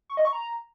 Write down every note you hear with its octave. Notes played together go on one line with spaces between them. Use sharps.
C#6
D#5
C#6
A#5